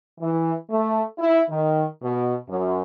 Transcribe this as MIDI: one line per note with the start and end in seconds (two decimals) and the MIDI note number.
0.20 0.52 52
0.69 1.02 57
1.18 1.41 64
1.50 1.84 51
2.02 2.34 47
2.48 2.82 42